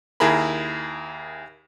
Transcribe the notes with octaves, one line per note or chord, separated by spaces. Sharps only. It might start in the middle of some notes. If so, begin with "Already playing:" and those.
D#2 E4 G#4 A#4 B5